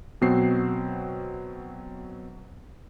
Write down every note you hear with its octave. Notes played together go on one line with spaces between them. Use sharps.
B2 F#3 C4 C7